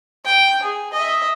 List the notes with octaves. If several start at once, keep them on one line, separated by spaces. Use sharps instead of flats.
G5
G#4
D#5 E5